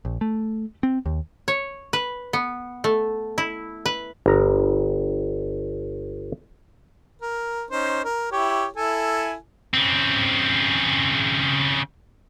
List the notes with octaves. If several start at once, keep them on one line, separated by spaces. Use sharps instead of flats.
A#1
A3
C4
D#2
C#5
B4
B3
A3
E4
B4
G1 A#5
A#4
C#4 D#4 C5
A#4
E4 G4 C#5
E4 A4 G#5
C#3 C4